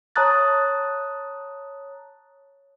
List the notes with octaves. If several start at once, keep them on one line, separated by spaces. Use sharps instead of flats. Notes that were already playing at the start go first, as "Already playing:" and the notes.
C#5 A5 A#5 D#6 F#6 A6